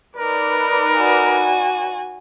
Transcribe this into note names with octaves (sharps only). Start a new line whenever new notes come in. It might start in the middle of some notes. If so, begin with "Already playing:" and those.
D#4 A#4 B4 D5
F#4 G#5